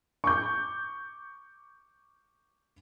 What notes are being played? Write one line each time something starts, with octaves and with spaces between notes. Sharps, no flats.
C#6 D6 G6